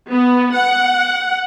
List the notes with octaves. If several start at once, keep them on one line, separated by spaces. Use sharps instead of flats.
B3
F#5